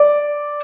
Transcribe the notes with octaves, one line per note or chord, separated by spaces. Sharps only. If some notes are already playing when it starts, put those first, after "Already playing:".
Already playing: D5